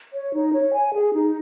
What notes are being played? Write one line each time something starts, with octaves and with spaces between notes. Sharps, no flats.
C#5
D#4
C#5
G#5
G#4
D#4